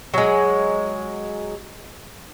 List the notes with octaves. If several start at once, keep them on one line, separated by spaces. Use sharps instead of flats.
F#3 G#3